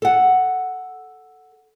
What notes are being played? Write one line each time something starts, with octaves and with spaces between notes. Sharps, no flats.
A4 F#5